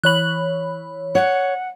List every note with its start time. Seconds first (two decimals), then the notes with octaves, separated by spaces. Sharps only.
0.04 E3 C#5 B5 F#6 F#7
1.15 C#5 F#5